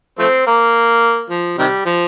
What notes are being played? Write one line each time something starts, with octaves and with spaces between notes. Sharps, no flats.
F3 A3 C4
A#3
F3
C3 D#3 G3
F3